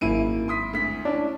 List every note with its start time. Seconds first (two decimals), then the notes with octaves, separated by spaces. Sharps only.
0.01 G#1 F#2 A#3 E4 D7 D#7
0.48 C6 D#6 B6
0.73 D2 B6
1.05 C#4 D4 E4